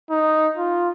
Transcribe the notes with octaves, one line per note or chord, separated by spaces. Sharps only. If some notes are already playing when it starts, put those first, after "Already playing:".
D#4
F4